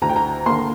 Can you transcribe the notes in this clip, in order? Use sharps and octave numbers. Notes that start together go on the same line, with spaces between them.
D2 A#5
G5
A#5
D3 A#3 C6